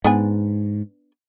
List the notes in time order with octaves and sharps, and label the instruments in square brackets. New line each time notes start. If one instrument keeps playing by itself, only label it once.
[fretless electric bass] G#2 [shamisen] B3 D4 G#5